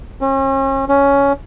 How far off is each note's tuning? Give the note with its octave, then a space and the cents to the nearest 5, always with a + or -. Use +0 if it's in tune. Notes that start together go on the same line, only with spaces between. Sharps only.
C#4 -40
C#4 +10